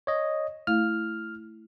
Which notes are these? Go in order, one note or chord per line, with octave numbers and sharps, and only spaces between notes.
C#5 D#5
A3 E4 F5 F6